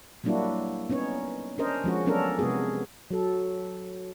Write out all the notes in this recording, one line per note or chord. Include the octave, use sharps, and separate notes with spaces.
F#3 G3 A#3 D4 E4 F#4
B3 C#4 D#4 C#5
C#4 D4 A#4 C5 D#5
F3 G#3 C#4 F#4
F#3 B3 C#4 D4 A4 A#4
C3 G#3 B3 F#4 G#4
F#3 A4